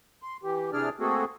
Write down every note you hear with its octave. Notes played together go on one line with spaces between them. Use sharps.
C6
E3 G4
C3 E3 D4 G#4 D5 F6
A3 A#3 C4 F#4 G#4 A4